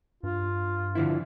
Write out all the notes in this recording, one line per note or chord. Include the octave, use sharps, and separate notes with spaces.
G2 F4
D3 F3 E4